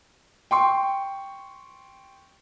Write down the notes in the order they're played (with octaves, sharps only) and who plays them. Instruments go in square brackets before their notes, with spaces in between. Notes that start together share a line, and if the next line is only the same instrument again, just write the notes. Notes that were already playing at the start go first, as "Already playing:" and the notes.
[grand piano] G5 C6 C#6